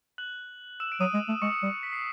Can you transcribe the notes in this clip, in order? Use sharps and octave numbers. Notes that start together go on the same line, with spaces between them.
F#6 F#7
E6 E7
D7
F#3 D#6 D#7
G#3
A3
G#3 C#6 C#7
G3
B6
C7